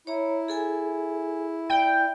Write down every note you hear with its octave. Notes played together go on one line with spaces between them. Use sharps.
E4 C#5 A#5
G#4 A4 G#5
D5 G5